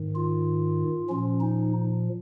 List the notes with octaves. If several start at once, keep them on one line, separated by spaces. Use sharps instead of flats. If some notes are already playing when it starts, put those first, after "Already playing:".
Already playing: G#2 D#3
F4
A#2 F3 C#4
D#4